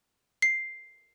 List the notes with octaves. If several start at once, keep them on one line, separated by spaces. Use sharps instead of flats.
C7